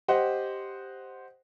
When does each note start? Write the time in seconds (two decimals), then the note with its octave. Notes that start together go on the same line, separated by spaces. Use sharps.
0.08 G4 C5 D#5 F#5